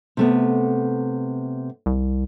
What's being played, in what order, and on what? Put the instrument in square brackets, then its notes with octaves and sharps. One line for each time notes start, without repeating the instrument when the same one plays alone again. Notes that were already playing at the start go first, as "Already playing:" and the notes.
[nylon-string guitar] C3 A3 B3
[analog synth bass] C2